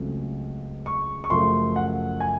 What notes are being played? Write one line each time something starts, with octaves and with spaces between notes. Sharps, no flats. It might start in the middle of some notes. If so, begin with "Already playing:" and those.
Already playing: C#2 C#3 F#3 A3 C4
C#6
C#6
F#2 C#3 F3 A3 C6
F#5
G#5